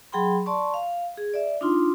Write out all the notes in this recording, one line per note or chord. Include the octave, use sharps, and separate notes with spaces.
F#3 G#4 G5 B5 C6
D5 A5 C6 C#6
F5
G#4
D5 E5
D4 D#4 F4 C6